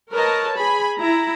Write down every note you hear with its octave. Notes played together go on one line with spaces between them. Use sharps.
A#4 B4 C#5 D#5 A5
G#4 G#5 B5
E4 A#5